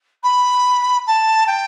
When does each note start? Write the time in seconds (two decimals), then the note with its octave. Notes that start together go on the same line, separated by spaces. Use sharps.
0.23 B5
1.07 A5
1.47 G5